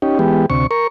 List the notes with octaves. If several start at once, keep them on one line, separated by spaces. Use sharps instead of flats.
C#4 D#4 G4
E3 G#3 B3 G4
D2 C3 C#6
A#4 C#6